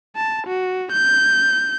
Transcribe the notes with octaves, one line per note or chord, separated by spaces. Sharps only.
A5
F#4
G6